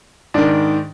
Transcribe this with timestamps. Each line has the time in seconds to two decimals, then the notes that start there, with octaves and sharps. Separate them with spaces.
0.34 G#2 D#3 D4